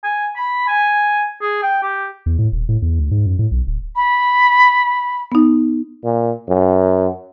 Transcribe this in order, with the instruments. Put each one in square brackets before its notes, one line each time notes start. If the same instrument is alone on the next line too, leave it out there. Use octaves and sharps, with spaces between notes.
[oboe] G#5
B5
G#5
G#4
G5
G4
[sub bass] E2
A2
D#1
A2
E2
D2
G#2
F#2
A2
B1
D1
[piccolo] B5
[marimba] B3 D#4
[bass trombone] A#2
F#2